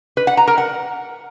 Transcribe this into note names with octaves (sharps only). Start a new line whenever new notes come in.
B4
F#5
A#5
A#4
F#5